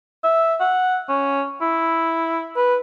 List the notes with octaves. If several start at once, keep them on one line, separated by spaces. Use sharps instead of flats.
E5
F#5
C#4
E4
B4